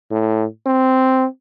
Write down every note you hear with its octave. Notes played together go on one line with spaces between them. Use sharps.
A2
C4